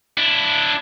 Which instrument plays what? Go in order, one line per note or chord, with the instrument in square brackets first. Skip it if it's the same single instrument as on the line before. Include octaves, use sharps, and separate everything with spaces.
[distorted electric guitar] D4 E4